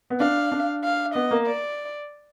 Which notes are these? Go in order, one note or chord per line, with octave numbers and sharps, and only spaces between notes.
B3
D4 F5
D4
F5
B3 D#5
A#3
D5